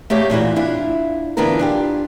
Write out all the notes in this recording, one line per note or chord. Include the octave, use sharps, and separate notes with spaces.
A3 A#3 G4 C#5 D#5
A#2 E3 F4 F#4
D4 E4 F4
D3 E3 B3 D4 F4 A#4
D4 F4 G4